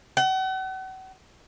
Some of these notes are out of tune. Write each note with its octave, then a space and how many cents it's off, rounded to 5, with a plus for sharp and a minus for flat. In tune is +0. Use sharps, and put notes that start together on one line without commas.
F#5 +40